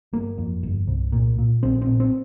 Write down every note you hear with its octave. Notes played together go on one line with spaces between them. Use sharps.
G1 A#3
F2
G1
C2
A#2
A#2
A#1 C4
C4
A#2
C4